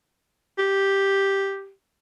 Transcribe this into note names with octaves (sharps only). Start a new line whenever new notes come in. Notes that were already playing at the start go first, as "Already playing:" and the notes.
G4